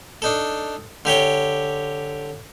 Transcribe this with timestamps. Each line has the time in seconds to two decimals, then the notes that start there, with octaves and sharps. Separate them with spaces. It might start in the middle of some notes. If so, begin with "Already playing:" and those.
0.22 D4 D#4 A4
1.05 D3 G4 C#5 G5